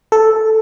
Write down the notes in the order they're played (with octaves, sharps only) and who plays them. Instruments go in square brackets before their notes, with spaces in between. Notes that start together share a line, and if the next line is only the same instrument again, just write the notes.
[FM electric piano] A4